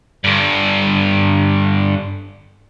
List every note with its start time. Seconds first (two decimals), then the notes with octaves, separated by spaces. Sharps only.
0.24 G2 D3